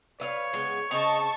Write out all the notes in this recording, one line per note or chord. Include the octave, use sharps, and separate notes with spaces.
B4 C#5 E5 F5
C#3 G#3 B3
C#3 C4 D#5 A5 A#5 C#6